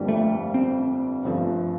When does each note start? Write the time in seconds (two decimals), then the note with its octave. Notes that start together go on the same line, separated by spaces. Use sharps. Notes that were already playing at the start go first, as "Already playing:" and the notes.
Already playing: G1 F2 D3 G3 A#3
0.08 A3
0.54 C4
1.25 G1 G2 F3 A3